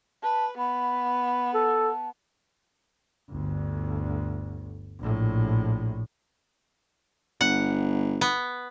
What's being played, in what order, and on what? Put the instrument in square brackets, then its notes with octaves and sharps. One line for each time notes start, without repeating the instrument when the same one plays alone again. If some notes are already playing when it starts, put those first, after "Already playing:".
[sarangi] B4 [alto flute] A5
[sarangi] B3 [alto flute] B5
[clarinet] A4 [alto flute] A5
[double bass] G1 D2
A#1 A2
[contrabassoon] G1 [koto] F#5
[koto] B3